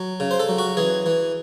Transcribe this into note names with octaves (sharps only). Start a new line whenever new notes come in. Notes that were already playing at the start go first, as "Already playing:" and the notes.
Already playing: F#3
C#3
C5
A4
F#3
F#4
E3 G#4
E3